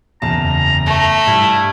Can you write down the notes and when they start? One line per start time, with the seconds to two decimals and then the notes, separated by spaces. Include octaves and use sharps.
0.22 F#1 E2 A5 A#5
0.86 A3
1.27 G2 G3 E4